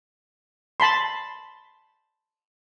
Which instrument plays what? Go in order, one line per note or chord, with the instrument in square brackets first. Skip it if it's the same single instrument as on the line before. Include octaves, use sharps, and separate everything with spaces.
[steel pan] A5 B5 C6